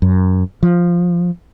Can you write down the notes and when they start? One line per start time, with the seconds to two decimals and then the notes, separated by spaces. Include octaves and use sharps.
0.02 F#2
0.63 F3